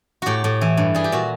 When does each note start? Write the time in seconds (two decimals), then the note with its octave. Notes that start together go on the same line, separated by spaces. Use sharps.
0.22 A2 F#4 G4
0.44 A2
0.61 E3
0.77 G2
0.95 G3 G#4
1.04 G4
1.12 A#2 F#4